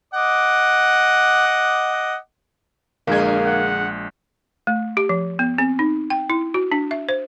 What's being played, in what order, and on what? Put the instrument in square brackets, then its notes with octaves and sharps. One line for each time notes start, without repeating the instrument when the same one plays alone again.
[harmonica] D#5 F#5 D6
[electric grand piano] A#1 G#3 G#6 [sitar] D3 G#4 [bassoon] A#3
[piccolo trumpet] F#5
[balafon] A3
G4
F3
B3
C4
D#4
G5
E4
F#4
D4
E5
C5